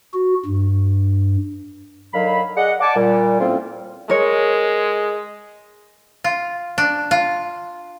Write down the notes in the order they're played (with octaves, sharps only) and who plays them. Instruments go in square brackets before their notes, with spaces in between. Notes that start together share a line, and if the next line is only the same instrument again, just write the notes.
[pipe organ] F#4
G2
[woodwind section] D3 D#3 F#3 F5 B5
G#4 D5 D#5 F#5
D5 F#5 G#5 A5 D6
A#2 G3
A2 F3 A#3 C4 C#4 F4
[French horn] G#3 [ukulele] A#4 C#5
[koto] F4
D4
F4